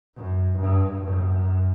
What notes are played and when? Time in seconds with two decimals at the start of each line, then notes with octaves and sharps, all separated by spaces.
0.15 F#2
0.57 G2
1.00 F#2